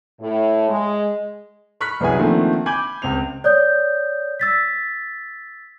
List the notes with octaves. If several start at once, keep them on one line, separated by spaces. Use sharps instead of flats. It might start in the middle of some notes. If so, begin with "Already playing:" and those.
A2
G#3
B5 C#6 F6 F#6 B6
C2 F#2 B3 E4 G#4 G#5
D3 D#3 F3 A3 A#3 C4
G#5 B5 D6 G6 G#6 F#7
C#2 C4 F7
C#5 D5 D#6 G6
E6 A6 B6